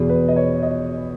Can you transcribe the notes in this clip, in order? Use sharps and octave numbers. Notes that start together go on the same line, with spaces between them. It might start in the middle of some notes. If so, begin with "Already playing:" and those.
Already playing: E2 B2 G#4
B4
D#5
C#5
D#5